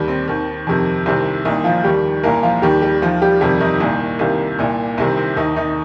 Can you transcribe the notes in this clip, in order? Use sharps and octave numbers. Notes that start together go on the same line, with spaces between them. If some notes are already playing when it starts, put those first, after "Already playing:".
Already playing: D#2 D#3 G3 G4
C4
D#2 D#3
F2 C3 D#3
C2 C3 D#3 C4
C2 A#2 D#3 D#4
F3 F4
D#2 D#3 G3 G4
C2 A#2 A#3 A#4
F3 F4
D#2 D#3 G3 G4
G3 G4
D#2 D#3 F3 F4
G3 G4
F2 C3 D#3 G3 G4
D#3 D#4
C2 A#2
C2 C3 D#3 A#3
C2 A#2
C2 C3 D#3 C4
C4
D#2 D#3 D#4
D#3 D#4